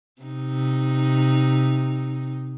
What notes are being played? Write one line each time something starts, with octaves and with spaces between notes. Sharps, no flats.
C3 D#4